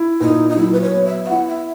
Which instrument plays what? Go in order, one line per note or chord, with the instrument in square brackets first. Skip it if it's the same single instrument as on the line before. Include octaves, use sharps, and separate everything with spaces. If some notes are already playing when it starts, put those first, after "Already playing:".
Already playing: [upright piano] E4
[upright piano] A#2 [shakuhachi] D#4
[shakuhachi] D#4
[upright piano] F#3 [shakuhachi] E4
[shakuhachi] B4
C#5
[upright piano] B3
[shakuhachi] E5
E5
[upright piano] E4 [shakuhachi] F#5
[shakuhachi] E5